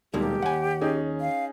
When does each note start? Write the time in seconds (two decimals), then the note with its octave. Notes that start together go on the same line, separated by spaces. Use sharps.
0.14 D#1 B2 D#3 G#3 A#3 G4
0.42 D#2 F#5 G#5
0.81 C#4 D#4 G#4
1.21 F5